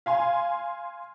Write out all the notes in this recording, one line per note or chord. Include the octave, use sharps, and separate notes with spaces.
F5 G#5 C6